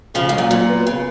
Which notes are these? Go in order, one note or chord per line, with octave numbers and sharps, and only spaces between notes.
C#3 F3 F4
G#2 F#3
A#2
A#2 F#3
B3
C#3 B3